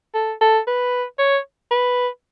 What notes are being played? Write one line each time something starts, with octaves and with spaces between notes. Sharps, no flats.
A4
A4
B4
C#5
B4